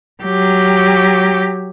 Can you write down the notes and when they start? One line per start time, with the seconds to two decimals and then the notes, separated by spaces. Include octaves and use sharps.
0.23 F#3 G4